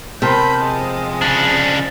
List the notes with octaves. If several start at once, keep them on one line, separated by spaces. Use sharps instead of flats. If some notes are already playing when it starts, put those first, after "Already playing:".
C3 A#4 C5 A5 B5 G6
F3 G#3 D#5
C#3 D4